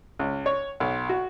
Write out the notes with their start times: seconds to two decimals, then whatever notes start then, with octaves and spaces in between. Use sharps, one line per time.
0.19 C#2
0.46 C#5
0.80 B1
1.09 F#4